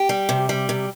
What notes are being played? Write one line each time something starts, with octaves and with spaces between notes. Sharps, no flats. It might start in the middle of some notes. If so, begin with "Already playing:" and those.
Already playing: G4
G3
C3
G3
C3